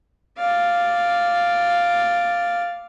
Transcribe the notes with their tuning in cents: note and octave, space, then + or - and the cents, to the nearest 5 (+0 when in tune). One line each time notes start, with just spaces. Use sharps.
D5 +0 F5 +0